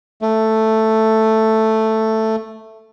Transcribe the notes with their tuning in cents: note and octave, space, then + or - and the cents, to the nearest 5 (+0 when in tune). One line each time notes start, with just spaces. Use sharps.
A3 +5